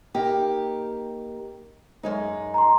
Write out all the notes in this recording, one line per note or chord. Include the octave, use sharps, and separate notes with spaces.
A#3 D#4 G4
F#2 G#3 D#4
A#5 C6